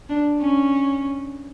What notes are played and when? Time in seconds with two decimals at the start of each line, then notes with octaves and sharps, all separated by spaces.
0.09 D4
0.41 C#4